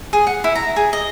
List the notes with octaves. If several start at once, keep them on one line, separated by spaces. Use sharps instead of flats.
G#4
F#5
E4
A#5
G#4
D#5